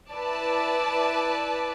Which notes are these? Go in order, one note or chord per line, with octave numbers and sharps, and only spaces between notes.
E4 B4 D5 A5